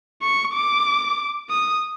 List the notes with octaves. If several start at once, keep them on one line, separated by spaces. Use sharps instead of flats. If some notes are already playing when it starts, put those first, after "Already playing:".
C#6
D6
D#6